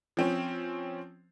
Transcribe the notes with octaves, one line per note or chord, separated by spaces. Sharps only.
F3 C4 C#4